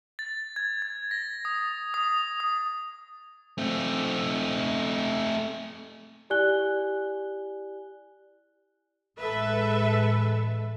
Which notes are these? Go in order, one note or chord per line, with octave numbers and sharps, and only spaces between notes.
A6
G#6
G#6
A#6
D#6
D#6
D#6
A3 C4
E4 G4 D5 G#5 F#6 G7
A1 A2 G#3 A4 B4 E5